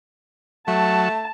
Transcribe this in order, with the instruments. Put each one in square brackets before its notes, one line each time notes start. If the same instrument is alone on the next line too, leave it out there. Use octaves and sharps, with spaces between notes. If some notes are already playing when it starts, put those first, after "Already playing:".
[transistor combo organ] F#3 [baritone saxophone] A3 [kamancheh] A5